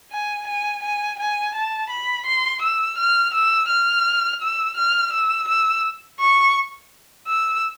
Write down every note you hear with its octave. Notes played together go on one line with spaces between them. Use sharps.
G#5
G#5
G#5
G#5
A5
B5
C6
E6
F6
E6
F6
E6
F6
E6
E6
C#6
E6